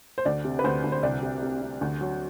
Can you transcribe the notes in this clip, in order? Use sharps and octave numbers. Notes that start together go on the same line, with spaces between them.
C5
D2 D5
C3
B4
D2 C5
D2
C5
C2 D5
C3
C3
C3
D2
F#3